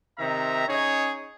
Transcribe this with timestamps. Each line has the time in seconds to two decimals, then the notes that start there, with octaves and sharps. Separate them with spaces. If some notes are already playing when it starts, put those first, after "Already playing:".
0.19 C3 D#3 E5 A#5
0.68 C#4 D#4 G#4 C#5